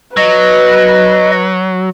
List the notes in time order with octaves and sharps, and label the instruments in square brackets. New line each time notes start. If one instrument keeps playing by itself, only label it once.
[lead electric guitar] F#3 [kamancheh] B4 [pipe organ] D#5